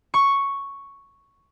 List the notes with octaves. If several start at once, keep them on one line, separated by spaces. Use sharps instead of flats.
C#6